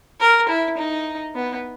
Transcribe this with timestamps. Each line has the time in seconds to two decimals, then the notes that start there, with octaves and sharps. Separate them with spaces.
0.20 A#4
0.48 E4
0.77 D#4
1.35 B3